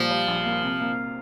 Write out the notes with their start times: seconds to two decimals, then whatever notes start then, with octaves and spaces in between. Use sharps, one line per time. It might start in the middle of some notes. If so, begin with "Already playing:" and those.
Already playing: A#2 F3 G3
0.10 G3
0.27 A#1
0.45 A#3
0.62 C3
0.81 A#3